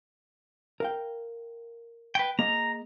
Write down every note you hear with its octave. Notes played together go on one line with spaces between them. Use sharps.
A#4 F5 G5
B4 G5
A#3 G#4 D#5 A#5